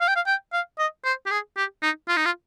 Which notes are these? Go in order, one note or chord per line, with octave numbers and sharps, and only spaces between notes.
F5
G5
F5
G5
F5
D#5
C5
G4
G#4
G4
D#4
F4
D#4
F4